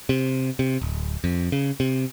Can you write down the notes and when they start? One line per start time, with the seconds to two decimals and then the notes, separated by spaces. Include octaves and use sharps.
0.09 C3
0.59 C3
0.81 D1
1.24 F2
1.52 C#3
1.80 C3